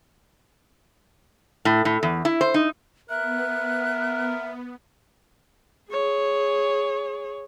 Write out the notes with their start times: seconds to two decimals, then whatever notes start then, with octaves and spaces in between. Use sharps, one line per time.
1.65 A2
1.85 A2
2.03 E2
2.25 E4
2.41 C5
2.54 D#4
3.10 B3 A#4 E5 F#6
5.90 G#4 C#5